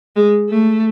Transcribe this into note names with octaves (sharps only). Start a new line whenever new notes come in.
G#3
A3